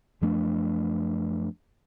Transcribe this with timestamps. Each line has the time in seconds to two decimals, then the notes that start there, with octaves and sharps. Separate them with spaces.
0.22 F#2 F3 A3 D4